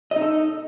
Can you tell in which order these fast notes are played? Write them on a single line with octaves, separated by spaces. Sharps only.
D#5 D#4 A4